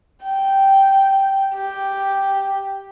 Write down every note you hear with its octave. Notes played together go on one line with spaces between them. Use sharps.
G5
G4